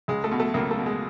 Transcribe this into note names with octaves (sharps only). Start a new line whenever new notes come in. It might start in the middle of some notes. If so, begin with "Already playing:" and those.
C#2 G#3
A3
B2
A3
C#2 A#3
A3
B2
G#3